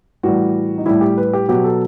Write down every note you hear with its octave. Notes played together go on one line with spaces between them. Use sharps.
A2 E3 G3 F#4
D#4
A2 G3 E4
G4
B4
G4
B2 F#3 G4
A4